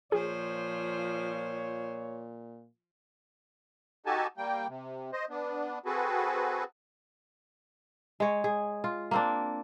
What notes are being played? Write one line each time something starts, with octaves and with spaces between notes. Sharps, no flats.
A#2 F3 G#4 C5 C#5
D#4 F#4 G4 A4 G#5 A5
G3 A#3 G5
C3
C5 D#5
B3 D4
C4 F#4 G#4 A4 B4
G#3 C#5
G#4
F4
A#3 C4 D4